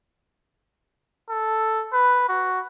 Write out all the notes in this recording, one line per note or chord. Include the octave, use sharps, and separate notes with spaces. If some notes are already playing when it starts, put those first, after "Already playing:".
A4
B4
F#4